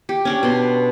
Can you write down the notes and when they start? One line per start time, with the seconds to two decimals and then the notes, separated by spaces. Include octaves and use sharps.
0.09 G4
0.25 C#4 D4 G4
0.43 B2 C6